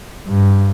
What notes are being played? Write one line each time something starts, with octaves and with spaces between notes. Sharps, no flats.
G2